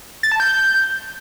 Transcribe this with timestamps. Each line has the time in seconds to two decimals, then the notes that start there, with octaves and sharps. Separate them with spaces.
0.23 A6
0.32 A5
0.40 G6